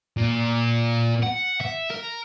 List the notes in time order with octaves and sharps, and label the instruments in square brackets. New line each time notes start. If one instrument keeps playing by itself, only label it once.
[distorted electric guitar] A#2
F#5
E5
A#4